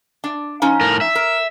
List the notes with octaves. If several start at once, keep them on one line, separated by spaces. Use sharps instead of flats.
D4
F3 C#4 D#4
A2 A#4
E5
A#4